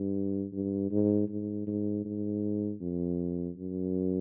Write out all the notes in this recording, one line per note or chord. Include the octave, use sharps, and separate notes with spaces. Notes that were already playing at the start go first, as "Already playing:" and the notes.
Already playing: G2
G2
G#2
G#2
G#2
G#2
F2
F#2